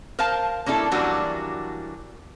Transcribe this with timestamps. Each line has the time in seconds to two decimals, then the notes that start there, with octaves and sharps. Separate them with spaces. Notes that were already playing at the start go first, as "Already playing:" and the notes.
0.19 A#4 C5 F5 A5
0.66 A#3 C#4 D4 E4 A4
0.91 E3 F#3 G3 A#3 D4 F#4